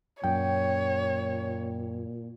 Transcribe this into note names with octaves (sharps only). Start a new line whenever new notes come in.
F#2 A#2 C#5 G5